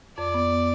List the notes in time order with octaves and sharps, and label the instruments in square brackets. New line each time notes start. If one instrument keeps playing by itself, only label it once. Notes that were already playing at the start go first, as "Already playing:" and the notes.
[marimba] F2 [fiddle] D5
[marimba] B3